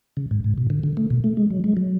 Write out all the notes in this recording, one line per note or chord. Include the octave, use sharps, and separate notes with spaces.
C#3
G#2
G#2
B2
D3
D3
A3
B2
A3
G#3
F#3
G#3
F#3